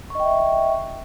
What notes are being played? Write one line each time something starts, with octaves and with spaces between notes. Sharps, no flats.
D#5 E5 G5 C#6